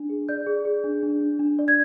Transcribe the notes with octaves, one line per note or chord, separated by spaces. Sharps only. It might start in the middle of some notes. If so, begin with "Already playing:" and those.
Already playing: D4
G#4
D5 G6
G#4
G#4
D4
D4
D4
D4
D5
G#6